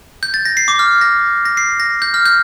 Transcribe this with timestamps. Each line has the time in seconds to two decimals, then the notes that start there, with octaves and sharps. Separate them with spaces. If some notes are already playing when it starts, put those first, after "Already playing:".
0.23 G6
0.34 A6
0.45 A#6
0.57 C7
0.68 D6
0.79 F6
1.01 A#6
1.45 A#6
1.57 C7
1.80 A#6
2.02 G6
2.14 F6
2.26 G6